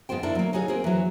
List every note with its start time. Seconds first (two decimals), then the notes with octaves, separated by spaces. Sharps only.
0.09 G#2 B3 F4 C5 G5
0.23 A#3 D4 E4 A4
0.35 F#3 A#3
0.53 D#4 F#4 G#4 C#5 F5
0.68 A#3 C4 G#4
0.84 E3 F#3